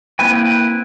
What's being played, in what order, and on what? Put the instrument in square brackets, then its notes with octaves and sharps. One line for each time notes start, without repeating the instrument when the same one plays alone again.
[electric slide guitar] A#3 C4 E4 B4 G5